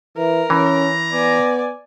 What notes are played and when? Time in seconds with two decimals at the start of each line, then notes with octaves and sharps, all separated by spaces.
0.17 E3 A#4
0.50 E3 C#4 A#5
1.12 B3 D5 G#5